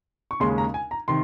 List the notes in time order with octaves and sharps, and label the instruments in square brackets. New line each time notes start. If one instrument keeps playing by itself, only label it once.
[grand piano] C#6
D#2 C#3 G#3 C#4 C6
A#5
G#5
A#5
C3 D#3 C6